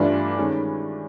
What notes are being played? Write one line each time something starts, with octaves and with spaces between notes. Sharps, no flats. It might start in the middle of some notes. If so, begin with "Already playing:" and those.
Already playing: G2 E3 A3 D4 F4
D#3 G#3 C#4